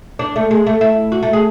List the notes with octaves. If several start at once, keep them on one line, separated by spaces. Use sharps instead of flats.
D4
A3
G#3
A3
E4
F#4
A3
G#4